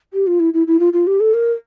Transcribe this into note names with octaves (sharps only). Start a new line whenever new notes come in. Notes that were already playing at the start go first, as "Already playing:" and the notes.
G4
F4
E4
E4
E4
F4
F4
G4
A4
A#4